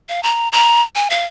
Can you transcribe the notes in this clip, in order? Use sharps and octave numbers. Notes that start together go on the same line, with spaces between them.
F5
A#5
A#5
G#5
F5